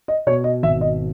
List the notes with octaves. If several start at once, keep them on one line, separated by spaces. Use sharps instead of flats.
D#5
B2 C#5
D#5
G#1 E5
D#5